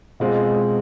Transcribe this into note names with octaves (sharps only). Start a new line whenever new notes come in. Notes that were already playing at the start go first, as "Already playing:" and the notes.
B2 G#3 C4 F4